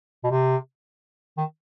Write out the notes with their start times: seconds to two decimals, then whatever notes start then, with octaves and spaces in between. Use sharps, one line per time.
0.24 B2
0.31 C3
1.37 D#3